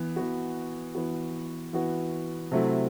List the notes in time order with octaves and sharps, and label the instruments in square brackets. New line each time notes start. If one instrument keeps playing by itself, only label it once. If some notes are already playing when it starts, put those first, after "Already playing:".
Already playing: [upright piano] E3 B3
E3 B3 F#4
E3 B3 F#4
E3 B3 F#4
C3 F#3 A3 E4